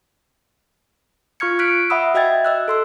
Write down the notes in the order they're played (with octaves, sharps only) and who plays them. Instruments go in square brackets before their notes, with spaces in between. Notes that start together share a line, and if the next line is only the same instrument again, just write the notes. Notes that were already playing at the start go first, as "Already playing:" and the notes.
[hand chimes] F4 C#6 F6 G#6 C#7
F6 F#6 B6 D7
E5 F#5 B5 D#6 E6
F#4 D#5 E5 G5 G#6 A6
D#5 E6 F#6
A4 C6 E6